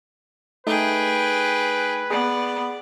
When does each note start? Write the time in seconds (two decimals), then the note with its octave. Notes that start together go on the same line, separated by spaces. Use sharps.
0.67 A3 D#4 G#4 B4 G5
2.11 B3 G#4 D5